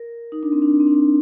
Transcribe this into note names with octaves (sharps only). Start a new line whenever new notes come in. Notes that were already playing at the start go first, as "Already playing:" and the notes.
Already playing: A#4
D#4
D4
C4
D4
C4
D4
C4